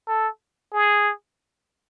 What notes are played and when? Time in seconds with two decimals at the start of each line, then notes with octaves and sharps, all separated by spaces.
0.08 A4
0.73 G#4